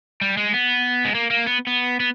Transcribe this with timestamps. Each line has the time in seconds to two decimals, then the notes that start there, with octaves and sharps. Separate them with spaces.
0.21 G3
0.37 G#3
0.54 B3
1.05 G#3
1.15 A#3
1.31 A#3
1.47 B3
1.67 B3
2.00 B3